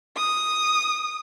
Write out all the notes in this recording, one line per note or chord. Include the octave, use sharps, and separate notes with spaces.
D#6